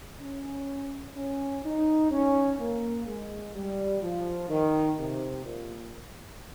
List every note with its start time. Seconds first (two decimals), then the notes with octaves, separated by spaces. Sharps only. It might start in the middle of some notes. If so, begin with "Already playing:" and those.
0.21 C#4
1.16 C#4
1.65 D#4
2.12 C#4
2.59 A#3
3.06 G#3
3.55 G3
4.02 F3
4.49 D#3
4.98 C3
5.45 A#2